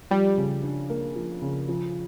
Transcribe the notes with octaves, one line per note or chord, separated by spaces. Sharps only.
F3 G3
C#3
D4
A#3
F3
C#3
F3